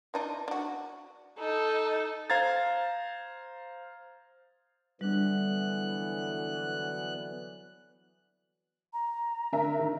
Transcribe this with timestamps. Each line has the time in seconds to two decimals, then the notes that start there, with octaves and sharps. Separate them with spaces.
0.14 E3 D4 D#4
0.48 D4 F#4
1.39 D#4 A4
2.30 C5 F5 A#5 G#6 A6
5.01 D3 E3 F#3 G3 B3 D4 F#6
8.93 A#5
9.52 D3 A#4 E5
9.79 D#3